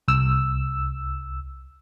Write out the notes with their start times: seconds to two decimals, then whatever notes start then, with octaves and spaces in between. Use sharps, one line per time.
0.08 C2 E6